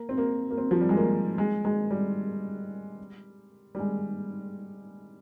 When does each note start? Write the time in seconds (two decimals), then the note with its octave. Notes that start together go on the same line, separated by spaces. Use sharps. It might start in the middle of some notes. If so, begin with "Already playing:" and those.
Already playing: A#3
0.09 C4
0.18 A#3
0.51 A#3
0.58 C4
0.71 F3
0.81 G3
0.89 G#3
0.97 A#3
1.38 G#3
1.65 G#3
1.91 G3
3.75 G3
3.79 G#3